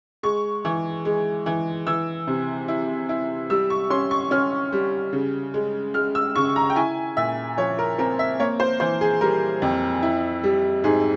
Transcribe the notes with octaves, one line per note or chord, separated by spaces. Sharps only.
G#3 C#6
E3
G#3
E3
E3 E6
C3
E4
E4
G3 E6
C#6
C#4 C6
C#6
C#4 F6
G3
C#3
G#3
G#3 F6
E6
C#3 C#6
A#5
G5
E4 G#5
A#2 E5
F3 C#5
A#4
C4 A#4
E5
A#3 C#5
C5
E3 C5
G#4
G3 A#4
F2
E4
G3
G#2 G#4